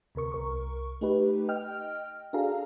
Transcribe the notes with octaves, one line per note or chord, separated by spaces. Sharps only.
D2 C3 A#4 C#6
C2 A#4 C#6
A3 D#4 G4 B4
D#5 G5 F6
D4 F#4 G#4 A4 F5 A#5